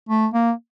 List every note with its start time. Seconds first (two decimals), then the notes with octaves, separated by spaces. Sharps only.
0.09 A3
0.34 A#3